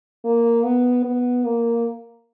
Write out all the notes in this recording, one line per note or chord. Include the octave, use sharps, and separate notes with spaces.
A#3
B3
B3
A#3